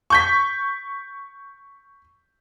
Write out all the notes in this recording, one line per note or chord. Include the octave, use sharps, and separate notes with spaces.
C#6 G6 B6